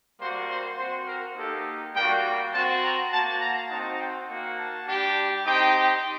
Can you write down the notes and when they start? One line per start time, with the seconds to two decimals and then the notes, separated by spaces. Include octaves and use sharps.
0.19 G3 A#3 F#4 C5
0.48 C5
0.78 C4 F#4 C5
1.07 A#4
1.36 A#3 D#4 G4 A4
1.95 G3 A#3 F#4 G5
2.53 C4 F#4 A5
2.82 A#5
3.12 A#3 F#4 A5
3.41 A#5
3.70 C4 D#4 F#4 A5
3.99 G5
4.28 A#3 F#4
4.57 A5
4.87 G3 D4 G4
5.45 C4 D#4 G4 G5